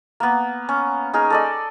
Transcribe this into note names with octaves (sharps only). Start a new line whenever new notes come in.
A#3 B3
C#4
D#4 G#4 A#4
A4 D5 D#5